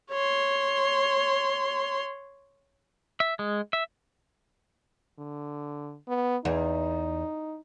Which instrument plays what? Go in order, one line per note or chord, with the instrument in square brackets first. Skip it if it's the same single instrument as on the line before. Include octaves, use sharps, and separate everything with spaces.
[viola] C#5 C6
[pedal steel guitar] E5
G#3
E5
[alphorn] D3
B3
[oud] E2 [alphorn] D#4